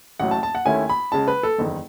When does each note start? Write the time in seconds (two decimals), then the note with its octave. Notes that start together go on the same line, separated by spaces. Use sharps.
0.20 A1 A2 F#3 F#5
0.31 A5
0.43 A5
0.55 F#5
0.65 D#2 D#3 A3 C#4 E4 G#5
0.89 B5
1.12 C#2 C#3 G#3 A5
1.28 B4
1.43 A4
1.58 F#1 E2 D#3